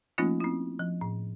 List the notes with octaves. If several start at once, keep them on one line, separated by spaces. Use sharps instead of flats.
F3 A3 A#3 C#4 D#4 F4
C4 E4
F3
A2